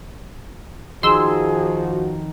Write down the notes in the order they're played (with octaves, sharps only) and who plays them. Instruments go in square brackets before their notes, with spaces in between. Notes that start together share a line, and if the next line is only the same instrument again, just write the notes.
[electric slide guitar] F2 D#3 D#4 [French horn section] F3 F#4 [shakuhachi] G#4 [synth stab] C6 E6